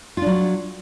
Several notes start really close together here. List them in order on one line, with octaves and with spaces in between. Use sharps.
F4 D4 F#3